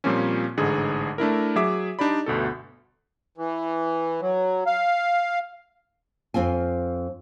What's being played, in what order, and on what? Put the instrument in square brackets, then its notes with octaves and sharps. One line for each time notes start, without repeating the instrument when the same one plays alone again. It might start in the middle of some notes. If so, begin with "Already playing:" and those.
[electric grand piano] A#2 F3 G3 A#3 C4 C#4
A1 G#2 D3 G#4
A3 D4 E4 A#4
F#3 G#4 E5 D6
D4 D#4 G4 D5 B5
G1 D2 B2 A4
[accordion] E3
F#3
F5
[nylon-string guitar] F2 C4 F4 G#5